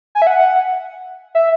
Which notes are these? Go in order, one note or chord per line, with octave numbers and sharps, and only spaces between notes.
G#5
E5
F#5
E5